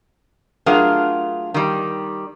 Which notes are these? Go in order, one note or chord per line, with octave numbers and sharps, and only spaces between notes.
F#3 A3 D4 F4 G#4 A#4
D#3 G3